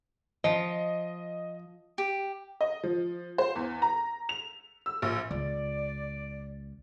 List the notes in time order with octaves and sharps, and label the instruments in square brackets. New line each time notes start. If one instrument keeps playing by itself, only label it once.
[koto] F3 [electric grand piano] D#5
[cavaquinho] G4
[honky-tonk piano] D#5
F3
C5
E2
A#5
F7
E6
A#1
[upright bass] C#2 [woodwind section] D5